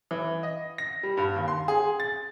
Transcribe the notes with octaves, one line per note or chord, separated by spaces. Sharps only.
E3
D#5
A#6
G3
G2
D#2
C6
G#4
A6